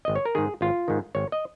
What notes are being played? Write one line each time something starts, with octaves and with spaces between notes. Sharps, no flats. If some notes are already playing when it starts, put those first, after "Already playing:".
G#1 D#5
C#5
A#4
G#2 D#3 G#4
G#1 F4
G#2 D#3
G#1 C#5
D#5